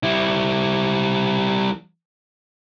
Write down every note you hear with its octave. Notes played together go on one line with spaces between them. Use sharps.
G3 E4